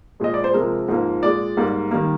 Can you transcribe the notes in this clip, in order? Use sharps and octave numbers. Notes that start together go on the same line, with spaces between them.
A#2 F3 G#3 D#5
D5
C5
C3 F3 G#3 A#4
G#2 F3 A#3
A#2 G#3 D5
G#2 G3 A#3
D#3 G3 A#3